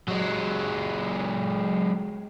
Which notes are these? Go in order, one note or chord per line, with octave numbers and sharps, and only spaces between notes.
F#3 G#3